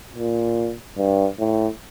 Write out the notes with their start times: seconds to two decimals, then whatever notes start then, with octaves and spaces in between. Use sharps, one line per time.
0.15 A#2
0.97 G2
1.39 A2